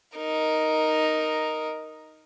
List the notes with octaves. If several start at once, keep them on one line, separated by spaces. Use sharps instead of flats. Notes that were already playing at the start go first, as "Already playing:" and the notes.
D#4 A#4